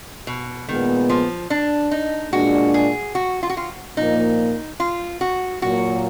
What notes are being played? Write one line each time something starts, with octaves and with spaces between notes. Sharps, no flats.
B2
A#2 D#3 G#3 B3
F3
D4
D#4
A#2 G#3 D4 F#4
G#4
F#4
F4
F#4
F4
A#2 F3 A#3 D#4
F4
F#4
A#2 F#3 A#3 F#4